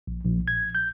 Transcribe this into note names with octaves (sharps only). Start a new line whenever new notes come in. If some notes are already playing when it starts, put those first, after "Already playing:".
A#1
A#1
G#6
G6